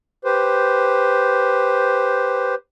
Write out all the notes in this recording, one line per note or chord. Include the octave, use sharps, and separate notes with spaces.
G4 B4 C5